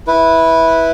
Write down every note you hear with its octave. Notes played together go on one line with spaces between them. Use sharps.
E4 B4